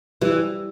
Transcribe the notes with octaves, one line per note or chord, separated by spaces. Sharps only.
E3 G3